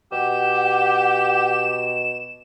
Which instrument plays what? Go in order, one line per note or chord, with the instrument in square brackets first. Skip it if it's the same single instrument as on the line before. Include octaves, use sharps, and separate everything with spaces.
[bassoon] B2 [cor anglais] G4 [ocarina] F#5 [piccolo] E7